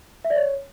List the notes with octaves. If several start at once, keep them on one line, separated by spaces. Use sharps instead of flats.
E5
D5
C#5